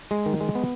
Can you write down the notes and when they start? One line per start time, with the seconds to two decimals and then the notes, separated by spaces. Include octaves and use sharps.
0.11 G#3
0.26 D#3
0.41 G#3
0.55 B3